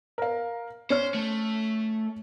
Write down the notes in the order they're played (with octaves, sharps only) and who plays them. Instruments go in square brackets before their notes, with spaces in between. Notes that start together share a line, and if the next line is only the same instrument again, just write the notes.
[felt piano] A#4 F5
[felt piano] C#4 C#5 F6 [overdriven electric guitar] C5
[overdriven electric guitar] A3